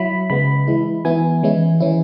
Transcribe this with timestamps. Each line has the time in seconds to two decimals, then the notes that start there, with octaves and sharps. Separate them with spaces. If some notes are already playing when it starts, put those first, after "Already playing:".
Already playing: F#3 E4 B5
0.30 C#3 G#3 B3 B5
0.67 E3 G#3 E4
1.05 E3 B3 E4 G#5
1.43 E3 G#3 C#4 E4
1.80 E3 C#4 E4